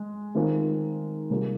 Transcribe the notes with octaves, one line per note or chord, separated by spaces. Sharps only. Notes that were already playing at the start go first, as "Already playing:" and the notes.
Already playing: G#3
D#3 G#3 C4 F4 A#4
C3 G3 A#3 F4 G#4